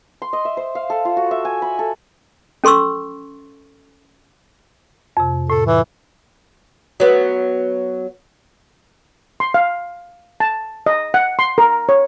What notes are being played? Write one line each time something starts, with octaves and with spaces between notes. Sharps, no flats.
C6
D#5
E5
C5
F5
A4
F4
F#4
E5
G#5
B5
A4
C#4 A4 C6 C#6 E6
F2 C3
A2 A4
E3
F#3 B3
C6
F5
A5
D#5
F#5
C6
A#4
C#5